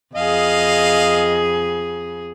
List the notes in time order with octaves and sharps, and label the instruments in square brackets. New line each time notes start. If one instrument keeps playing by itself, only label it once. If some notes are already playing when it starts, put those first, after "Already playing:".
[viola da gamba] F2 G#4 [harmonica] D#5 F5